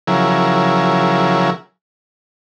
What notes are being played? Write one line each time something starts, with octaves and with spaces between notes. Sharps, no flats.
C#3 F3 F#3 E4 G#4 A#4